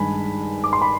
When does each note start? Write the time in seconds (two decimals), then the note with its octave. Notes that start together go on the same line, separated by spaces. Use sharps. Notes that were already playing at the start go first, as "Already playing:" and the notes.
Already playing: G2 D#3 G#3 G#5 B5
0.64 D6
0.73 C6
0.82 B5